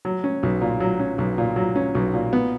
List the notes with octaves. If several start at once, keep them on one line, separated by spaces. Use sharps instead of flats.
F#3
C#4
B1
A#2
F#3
C#4
B1
A#2
F#3
C#4
B1
A#2
B3